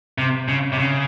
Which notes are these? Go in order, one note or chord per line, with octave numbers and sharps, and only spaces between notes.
C3
C#3
C3
C#3